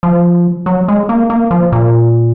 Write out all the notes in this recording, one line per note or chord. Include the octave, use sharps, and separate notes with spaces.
F3
F#3
G#3
A#3
A#3
F3
A#2